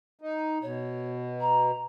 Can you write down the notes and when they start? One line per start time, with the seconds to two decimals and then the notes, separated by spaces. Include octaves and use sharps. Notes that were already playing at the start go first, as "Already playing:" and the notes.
0.21 D#4
0.62 B2 C#5
1.40 A#5